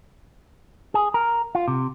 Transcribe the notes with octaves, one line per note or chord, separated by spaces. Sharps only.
G#4
A#4
F4
C3